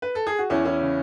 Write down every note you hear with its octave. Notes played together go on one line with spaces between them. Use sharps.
B4
A4
G#4
F#4
E2 C#4 E4
E3 C#4 E4
C#3